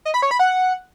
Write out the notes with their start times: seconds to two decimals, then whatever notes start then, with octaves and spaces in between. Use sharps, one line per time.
0.05 D#5
0.14 B5
0.22 C#5
0.31 B5
0.39 F#5